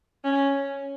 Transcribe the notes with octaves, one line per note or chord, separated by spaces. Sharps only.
C#4